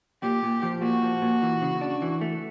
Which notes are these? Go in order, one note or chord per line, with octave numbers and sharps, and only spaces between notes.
A#2 G4
A#2
F3
A#2 F#4
F3
A#2
E3
C#3
D4
E3
A3